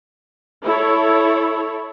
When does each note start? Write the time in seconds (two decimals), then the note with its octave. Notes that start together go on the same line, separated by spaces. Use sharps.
0.65 E4 A4 C#5